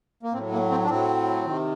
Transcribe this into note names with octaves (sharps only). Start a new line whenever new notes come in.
A#3
A2 F#3 C4
A#3
C4
D4
A2 F#3 C4
C3 D#3